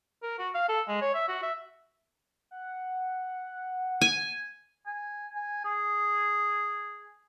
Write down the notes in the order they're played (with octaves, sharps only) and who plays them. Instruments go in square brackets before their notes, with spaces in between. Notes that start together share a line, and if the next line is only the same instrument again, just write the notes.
[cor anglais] A#4
F#4
F5
A4
G#3
C#5
E5
F#4
E5
[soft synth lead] F#5
[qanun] G#5
[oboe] G#5
G#5
G#4